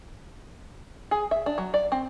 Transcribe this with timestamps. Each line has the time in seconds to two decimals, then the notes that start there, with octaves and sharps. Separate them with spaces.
1.11 G#4
1.31 E5
1.46 D4
1.58 F#3
1.74 D5
1.92 C4